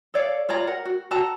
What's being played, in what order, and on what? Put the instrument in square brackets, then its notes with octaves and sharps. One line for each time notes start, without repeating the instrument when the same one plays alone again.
[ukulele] A4 C#5 D5 F5
F4 C#5 D5 A#5
A#4 F#5
F#4
F#4 A4 A5 A#5